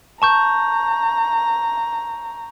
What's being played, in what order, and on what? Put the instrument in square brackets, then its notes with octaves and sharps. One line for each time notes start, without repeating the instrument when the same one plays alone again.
[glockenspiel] A5 C#6 G6 [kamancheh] A#5